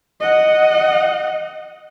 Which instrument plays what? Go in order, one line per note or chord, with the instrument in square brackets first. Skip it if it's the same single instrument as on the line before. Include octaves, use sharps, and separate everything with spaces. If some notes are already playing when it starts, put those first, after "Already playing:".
[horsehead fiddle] D#5 F#5